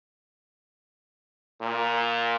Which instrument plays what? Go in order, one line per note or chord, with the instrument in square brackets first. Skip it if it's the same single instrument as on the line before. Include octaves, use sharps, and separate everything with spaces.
[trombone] A#2